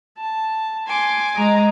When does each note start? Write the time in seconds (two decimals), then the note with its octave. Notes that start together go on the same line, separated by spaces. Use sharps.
0.18 A5
0.87 G#5 C6 D6
1.35 G#3 D#5 A#5